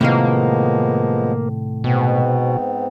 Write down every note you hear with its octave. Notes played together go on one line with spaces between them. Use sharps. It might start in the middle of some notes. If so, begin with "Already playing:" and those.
A2 C3 D#3 F3 G#3 A#3 B3 F5
G#2 B2 B3 C4